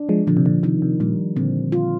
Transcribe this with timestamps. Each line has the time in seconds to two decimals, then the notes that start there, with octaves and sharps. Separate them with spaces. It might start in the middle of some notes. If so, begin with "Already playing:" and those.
Already playing: D4
0.09 F3 G#3
0.27 A#2 D3 F3
0.37 C3
0.46 A#2 D3
0.63 C3 D#3
0.82 C3
1.00 A#2 G3
1.36 A#2 D3 C4
1.72 F4